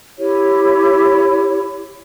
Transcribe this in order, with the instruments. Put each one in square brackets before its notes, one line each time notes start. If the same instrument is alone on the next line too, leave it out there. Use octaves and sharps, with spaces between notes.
[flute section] E4 G4 C#5